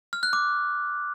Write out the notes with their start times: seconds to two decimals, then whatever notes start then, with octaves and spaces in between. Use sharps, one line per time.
0.13 F6
0.23 F#6
0.33 D6